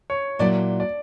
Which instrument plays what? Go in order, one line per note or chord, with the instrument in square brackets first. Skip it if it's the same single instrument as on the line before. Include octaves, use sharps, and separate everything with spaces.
[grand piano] C#5
[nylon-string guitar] A#2 F#3 A#3 E4 [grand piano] D5
[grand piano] D5